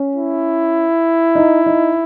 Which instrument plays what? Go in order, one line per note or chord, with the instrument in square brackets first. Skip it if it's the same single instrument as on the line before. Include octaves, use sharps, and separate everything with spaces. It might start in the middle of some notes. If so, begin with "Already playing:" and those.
Already playing: [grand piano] C#4
[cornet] E4
[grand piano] D#4
D#4